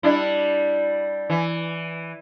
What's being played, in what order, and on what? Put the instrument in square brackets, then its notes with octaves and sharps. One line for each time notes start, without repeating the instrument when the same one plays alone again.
[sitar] G3 D4 E4
E3